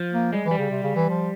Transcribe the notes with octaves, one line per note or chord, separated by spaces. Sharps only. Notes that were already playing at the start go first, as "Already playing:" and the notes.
Already playing: F3
A#3
G3 G#3
E3
G3
C#3
C3
C#3
E3
F3